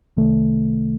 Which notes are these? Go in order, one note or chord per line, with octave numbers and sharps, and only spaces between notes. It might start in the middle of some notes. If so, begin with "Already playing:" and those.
C2 C3 D#3 A3